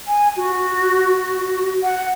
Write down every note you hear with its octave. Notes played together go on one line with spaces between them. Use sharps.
G#5
F#4
F#5